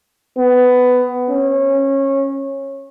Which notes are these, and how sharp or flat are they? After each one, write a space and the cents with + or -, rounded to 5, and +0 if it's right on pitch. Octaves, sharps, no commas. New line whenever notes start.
B3 +15
C#4 -20